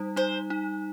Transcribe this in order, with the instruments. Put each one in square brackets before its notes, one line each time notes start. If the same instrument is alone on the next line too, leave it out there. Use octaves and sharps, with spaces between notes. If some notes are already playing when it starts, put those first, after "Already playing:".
Already playing: [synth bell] G3 D#4
[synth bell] D#4 [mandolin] C5
[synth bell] D#4